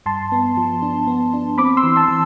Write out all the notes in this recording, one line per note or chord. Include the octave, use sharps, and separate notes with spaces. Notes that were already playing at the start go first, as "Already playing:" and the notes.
G2 A5 C6
B3
F3
D4
B3
D4
C4 B5 D6
C6 E6
E3
A5 C6
E3